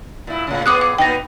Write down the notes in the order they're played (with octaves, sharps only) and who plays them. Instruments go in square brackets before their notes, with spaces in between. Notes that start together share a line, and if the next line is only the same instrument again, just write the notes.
[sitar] A#2 E4
A2 C#3
[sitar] A#2 B3 G#4 [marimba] D6 D#6 F#6
[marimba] D6
[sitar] A#2 B3 D#4 [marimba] G5 A#6